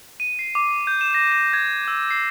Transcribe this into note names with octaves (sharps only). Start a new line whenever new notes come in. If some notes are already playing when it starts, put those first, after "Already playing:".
D#7
C7
D6
G6
E7
A#6
A#6
G#6
E6
C7